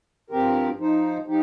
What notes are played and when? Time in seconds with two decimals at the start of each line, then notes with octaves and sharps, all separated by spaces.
0.30 G2 F3 C4 G4 A#4
0.79 F3 D#4 C5
1.27 F3 D#4 G4